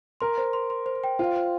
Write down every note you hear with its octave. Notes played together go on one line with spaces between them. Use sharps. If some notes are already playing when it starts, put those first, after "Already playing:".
A#4 C6
C5
C6
C6
C5
G5
F4 C5
C5